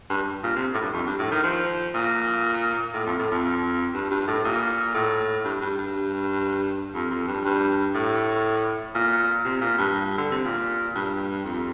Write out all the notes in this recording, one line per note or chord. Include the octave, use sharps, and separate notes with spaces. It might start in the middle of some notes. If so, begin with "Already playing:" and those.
G2
A#2
C3
A2
G2
F2
G2
A2
D#3
F3
A#2
A2
F2
A2
F2
G2
G2
A2
A#2
A2
G2
G2
G2
F2
F2
G2
G2
A2
A#2
C3
A#2
G2
D3
C3
A#2
G2
F2